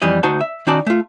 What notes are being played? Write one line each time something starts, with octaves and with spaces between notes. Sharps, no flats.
F2 E3 G3 D#5
D2 D#4 F#4 C5 A5
E5
D#3 C#4 D#4 F#4 D5 A5
A3 F4